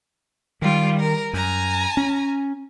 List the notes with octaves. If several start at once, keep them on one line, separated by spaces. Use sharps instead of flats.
D#3 G3 F4
A#4
F#2 G#5 A#5
C#4